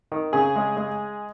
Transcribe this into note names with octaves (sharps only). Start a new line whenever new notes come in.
D#3
C#3 G#4
G#3
G#3